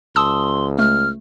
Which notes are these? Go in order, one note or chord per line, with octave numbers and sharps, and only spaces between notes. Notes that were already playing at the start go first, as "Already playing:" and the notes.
C#2 A5 C6 D#6 E6
A3 F6